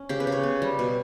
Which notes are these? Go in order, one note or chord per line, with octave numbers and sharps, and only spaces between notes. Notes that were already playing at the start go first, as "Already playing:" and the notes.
Already playing: C#4
C#3 G4
B4
C#3
C#5
B3
G3
B2